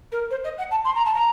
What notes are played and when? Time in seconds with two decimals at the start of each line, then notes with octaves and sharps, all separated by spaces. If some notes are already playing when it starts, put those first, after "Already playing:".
0.12 A#4
0.30 C5
0.44 D#5
0.58 F#5
0.70 A5
0.84 C6
0.95 A#5
1.05 A5
1.14 A#5